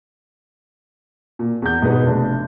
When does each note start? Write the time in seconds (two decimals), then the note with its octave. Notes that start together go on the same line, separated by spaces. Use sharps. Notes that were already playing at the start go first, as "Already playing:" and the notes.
1.39 A#2
1.62 E2 G6
1.82 G#2 B2 B3 D#4
2.06 F1 D4